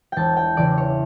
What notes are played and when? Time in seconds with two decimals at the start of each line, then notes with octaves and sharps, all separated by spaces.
0.12 E1 G5 A5
0.37 G5
0.57 E2 C#3 E3 D5
0.78 C#5